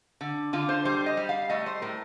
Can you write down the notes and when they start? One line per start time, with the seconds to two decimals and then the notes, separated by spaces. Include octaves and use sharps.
0.21 D3
0.53 D3 F4
0.69 C5
0.85 G3 C5
1.06 D#5
1.17 G3
1.29 F5
1.49 A3 D#5
1.66 C5
1.82 A2 A#4